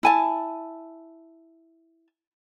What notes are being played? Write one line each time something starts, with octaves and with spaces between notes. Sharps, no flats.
E4 G#5 A5